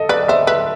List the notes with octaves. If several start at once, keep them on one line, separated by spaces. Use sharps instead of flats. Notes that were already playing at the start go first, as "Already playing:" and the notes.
Already playing: A4 D#5
B4 D5
C5 E5
B4 E5